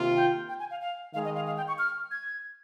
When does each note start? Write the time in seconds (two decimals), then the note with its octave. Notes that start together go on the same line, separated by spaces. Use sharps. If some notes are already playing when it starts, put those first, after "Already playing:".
Already playing: C3 D#3 A#3 F4
0.16 G5
0.49 G5
0.59 G#5
0.70 F5
0.81 F5
1.13 D#3 G#3 D#4 G#4 F5
1.25 D#5
1.35 F5
1.46 F5
1.57 G5
1.68 C#6
1.79 F6
2.11 G#6